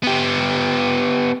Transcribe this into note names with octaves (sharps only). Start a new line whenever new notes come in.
B3 G4